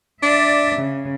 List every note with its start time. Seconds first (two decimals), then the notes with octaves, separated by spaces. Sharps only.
0.22 D4 D5 E5
0.76 C#3